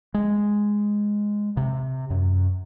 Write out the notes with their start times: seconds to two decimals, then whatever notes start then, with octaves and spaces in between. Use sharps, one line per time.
0.14 G#3
1.57 C3
2.10 F#2